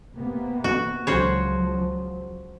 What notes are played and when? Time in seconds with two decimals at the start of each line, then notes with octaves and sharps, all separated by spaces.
0.14 C3 A#3 B3
0.64 F#4
1.07 C#2 F3 F#3 F#4 C5 C#5